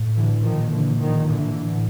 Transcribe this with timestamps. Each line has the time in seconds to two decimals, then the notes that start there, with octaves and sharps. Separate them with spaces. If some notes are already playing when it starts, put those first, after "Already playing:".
Already playing: A2
0.15 D3 E3
0.43 A#2 D#3 F3
0.71 D3 E3
1.00 D#3 F3
1.27 D3 E3
1.56 A2